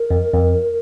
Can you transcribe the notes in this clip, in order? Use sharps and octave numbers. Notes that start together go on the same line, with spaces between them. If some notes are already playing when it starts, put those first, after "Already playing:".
Already playing: A#4
F2
F2